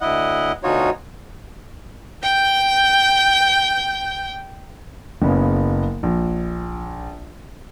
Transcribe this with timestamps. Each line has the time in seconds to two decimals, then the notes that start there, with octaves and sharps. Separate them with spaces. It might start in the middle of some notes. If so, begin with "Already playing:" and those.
0.01 D2 E4 D#5 F#5
0.63 D2 B2 D#4 F4 F#4 C#5
2.22 G5 G6
5.22 F#1 C#3 B3
6.03 A#1